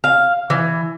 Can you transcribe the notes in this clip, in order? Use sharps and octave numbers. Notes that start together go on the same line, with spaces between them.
F5
E3